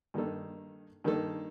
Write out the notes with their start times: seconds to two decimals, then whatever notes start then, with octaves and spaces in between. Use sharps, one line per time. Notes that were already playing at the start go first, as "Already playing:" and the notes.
0.14 G2 D#3 A#3 D#4 A4
1.04 G2 D#3 A#3 D#4 A4